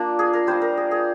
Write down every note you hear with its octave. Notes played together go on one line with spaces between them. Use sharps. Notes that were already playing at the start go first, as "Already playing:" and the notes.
Already playing: A#3 D4 F4 A#4
G#4
A#4
G3 D4 F4 C5
A#4
G#4
G#4